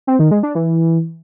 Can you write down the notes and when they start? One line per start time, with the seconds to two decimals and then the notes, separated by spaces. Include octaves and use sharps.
0.07 C4
0.19 D#3
0.31 G#3
0.43 D4
0.55 E3